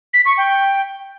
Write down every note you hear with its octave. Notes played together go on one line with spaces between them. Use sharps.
B6
C#6
G5